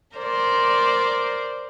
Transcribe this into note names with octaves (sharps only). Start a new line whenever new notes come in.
A#4 C5 D5